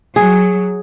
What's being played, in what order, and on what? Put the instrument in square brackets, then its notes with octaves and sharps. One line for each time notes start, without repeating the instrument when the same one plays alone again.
[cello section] F#3 [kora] G#4